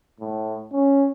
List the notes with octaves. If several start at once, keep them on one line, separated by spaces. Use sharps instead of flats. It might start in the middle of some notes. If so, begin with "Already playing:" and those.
A2
C#4